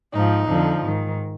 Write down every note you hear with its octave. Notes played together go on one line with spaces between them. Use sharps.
G#2 F3 D#4
F2 D3 F3
G#2 D#3